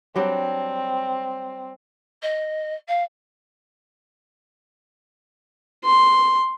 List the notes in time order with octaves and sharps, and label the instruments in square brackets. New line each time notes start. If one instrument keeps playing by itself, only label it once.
[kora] F#3 G3 D4 [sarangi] C4
[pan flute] D#5
F5
[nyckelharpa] C6